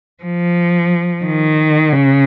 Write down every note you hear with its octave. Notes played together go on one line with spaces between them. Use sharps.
F3
D#3
C#3